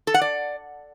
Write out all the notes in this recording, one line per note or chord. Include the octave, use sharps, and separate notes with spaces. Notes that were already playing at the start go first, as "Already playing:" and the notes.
A4
F#5
D5